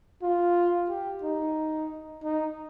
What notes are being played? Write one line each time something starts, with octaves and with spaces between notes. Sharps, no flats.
F4
G4
D#4
D#4